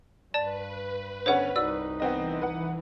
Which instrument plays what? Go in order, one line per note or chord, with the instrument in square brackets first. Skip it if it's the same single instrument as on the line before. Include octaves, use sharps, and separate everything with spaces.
[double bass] G2 [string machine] B4 [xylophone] D5 A5 A6
[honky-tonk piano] D3 B3 C#4 [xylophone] C5 C#5 F#5
[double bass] C2 D#4 [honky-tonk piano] F#4 [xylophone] D5 E6
[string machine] E3 [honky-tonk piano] B3 C4 D#5
[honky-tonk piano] B4 F#5